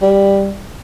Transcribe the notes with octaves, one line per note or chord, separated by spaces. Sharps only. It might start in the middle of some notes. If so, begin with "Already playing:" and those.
G3